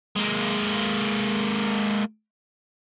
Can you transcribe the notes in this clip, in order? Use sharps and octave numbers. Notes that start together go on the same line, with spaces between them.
G#3 A#3